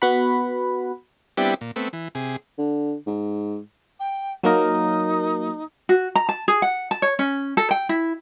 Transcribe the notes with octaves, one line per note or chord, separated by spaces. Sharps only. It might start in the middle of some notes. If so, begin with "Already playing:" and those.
B3 F#4 F#5 B5
G3 B3 C4 D4 E4 G4
A#2
A3 B3 C4
E3
C3 G#4
D3
G#2
G5
F#3 A#3 D#4 A#4
F#4
A#5
A5
G#4
F#5
A5
C#5
C#4
A4
G5
E4